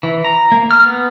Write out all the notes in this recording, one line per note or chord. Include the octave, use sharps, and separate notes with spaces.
E3
A#5
A#3
F6
B3